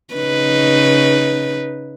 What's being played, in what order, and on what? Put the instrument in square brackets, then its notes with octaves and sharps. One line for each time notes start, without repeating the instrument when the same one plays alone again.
[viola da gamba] C#3 D#4 B4